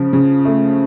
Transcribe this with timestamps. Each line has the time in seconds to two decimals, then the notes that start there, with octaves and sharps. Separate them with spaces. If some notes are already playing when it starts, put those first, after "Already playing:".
Already playing: C#3 F3
0.13 C#3
0.45 A3